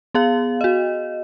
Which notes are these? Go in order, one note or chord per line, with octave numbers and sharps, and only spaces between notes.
B3 G#4 F5
F#4 D#5